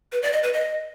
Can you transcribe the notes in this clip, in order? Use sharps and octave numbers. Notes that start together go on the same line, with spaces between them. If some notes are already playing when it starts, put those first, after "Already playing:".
B4
D5
D#5
B4
D#5